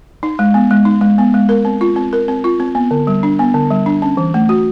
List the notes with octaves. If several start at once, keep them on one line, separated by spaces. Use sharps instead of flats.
D#4
G#3
B3
G#3
D#4
G#3
B3
G#3
A#4
C4
F4
C4
A#4
C4
F4
C4
B3
D3
G3
D4
B3
D3
G3
D4
C#4
E3
A3
F#4